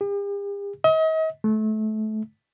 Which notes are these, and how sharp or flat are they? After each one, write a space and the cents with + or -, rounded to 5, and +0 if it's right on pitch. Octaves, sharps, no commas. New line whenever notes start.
G4 +45
D#5 +40
A3 -25